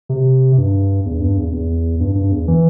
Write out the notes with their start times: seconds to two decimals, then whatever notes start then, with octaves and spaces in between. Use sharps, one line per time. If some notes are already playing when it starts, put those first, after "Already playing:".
0.09 C3
0.58 G2
1.06 E2
1.21 G2
1.37 E2
1.53 E2
2.00 G2
2.15 G2
2.32 E2
2.48 E3